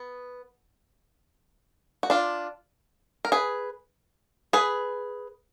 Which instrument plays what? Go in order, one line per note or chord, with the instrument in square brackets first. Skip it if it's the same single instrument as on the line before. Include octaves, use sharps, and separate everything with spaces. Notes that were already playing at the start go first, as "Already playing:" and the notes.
Already playing: [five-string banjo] B3
F#4
D4 F4
A#4
G#4 B4
G#4 B4